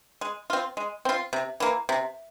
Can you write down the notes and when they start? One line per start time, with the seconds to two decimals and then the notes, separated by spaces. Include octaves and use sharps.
0.21 G#3
0.50 C4 F4
0.77 G#3
1.05 C4 F4
1.33 C3
1.60 E3 A#3
1.89 C3